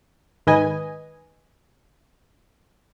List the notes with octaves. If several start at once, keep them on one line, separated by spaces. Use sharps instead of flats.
G#2 D#3 B4 D#5 G#5